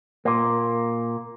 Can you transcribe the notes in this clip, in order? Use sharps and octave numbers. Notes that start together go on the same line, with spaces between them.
A#2 A#3